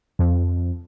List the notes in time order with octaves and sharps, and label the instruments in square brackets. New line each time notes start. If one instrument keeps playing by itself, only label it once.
[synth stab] F2